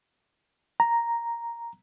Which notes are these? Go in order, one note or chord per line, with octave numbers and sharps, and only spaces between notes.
A#5